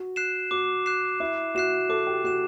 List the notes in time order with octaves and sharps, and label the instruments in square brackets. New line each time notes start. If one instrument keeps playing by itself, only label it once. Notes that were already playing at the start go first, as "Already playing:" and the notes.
Already playing: [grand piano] F#4
[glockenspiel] F#6 C7 E7
[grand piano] F#4 [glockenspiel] D6
[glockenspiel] F#6 C7 E7
[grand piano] E4 [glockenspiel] D6
[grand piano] F#4 [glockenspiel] F#6 C7 E7
[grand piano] A4 [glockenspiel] D6
[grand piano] G4
[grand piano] F#4 [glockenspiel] F#6 C7 E7